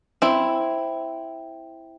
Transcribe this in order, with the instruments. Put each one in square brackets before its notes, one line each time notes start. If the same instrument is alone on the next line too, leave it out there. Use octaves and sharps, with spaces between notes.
[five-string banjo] C4 E4